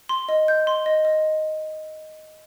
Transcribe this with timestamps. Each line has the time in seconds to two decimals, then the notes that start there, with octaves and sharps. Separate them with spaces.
0.09 C6
0.29 D#5
0.48 G6
0.67 C6
0.86 D#5
1.05 D#5